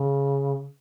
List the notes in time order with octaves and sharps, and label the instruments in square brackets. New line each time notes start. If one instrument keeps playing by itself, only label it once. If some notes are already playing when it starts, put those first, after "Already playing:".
Already playing: [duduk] C#3